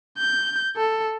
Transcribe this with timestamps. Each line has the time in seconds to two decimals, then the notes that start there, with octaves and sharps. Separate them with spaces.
0.18 G6
0.76 A4